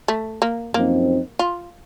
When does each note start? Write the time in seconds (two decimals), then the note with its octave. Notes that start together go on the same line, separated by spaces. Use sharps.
0.08 A3
0.42 A#3
0.74 F#2 F3 A#3 C4 D#4
1.39 F4